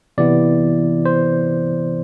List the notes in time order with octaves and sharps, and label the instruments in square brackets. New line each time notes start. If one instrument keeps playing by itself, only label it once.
[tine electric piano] C3 E3 B3 E4 D5
C5